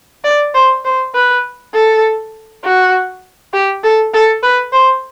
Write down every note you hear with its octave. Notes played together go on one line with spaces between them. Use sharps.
D5
C5
C5
B4
A4
F#4
G4
A4
A4
B4
C5